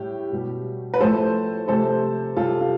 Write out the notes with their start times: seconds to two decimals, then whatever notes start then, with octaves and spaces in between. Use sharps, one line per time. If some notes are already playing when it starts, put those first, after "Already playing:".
Already playing: A2 G3 G4
0.32 B2 G3
0.94 B4
1.00 A2 F3 A3 A4 C5
1.68 C3 F3 A3 A4 C5
2.36 C3 G3 F4 A4
2.60 F4